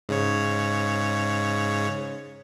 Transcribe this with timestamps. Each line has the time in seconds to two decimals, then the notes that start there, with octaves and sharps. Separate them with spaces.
0.09 G#2 C#3 C#5